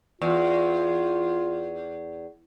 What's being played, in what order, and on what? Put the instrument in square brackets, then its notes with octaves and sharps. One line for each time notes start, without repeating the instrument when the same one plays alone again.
[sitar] E2 [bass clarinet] F4